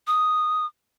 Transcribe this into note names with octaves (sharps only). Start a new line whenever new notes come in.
D#6